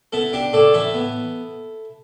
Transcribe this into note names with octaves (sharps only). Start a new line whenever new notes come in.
B3 E4 A4
D4 G4
A2 A4 D5
E3 E4 A4
B3